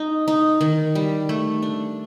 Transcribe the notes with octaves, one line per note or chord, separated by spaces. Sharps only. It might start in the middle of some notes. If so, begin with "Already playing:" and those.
Already playing: D#4
D#4
D#3
G3
A3
D4